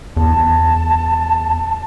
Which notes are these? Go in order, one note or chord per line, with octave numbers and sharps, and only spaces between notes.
E2 A5